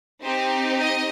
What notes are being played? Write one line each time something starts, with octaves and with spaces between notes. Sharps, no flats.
C4 D#4 G4 C5
D#5